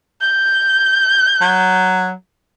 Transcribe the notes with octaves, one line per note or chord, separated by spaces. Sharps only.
G6
F#3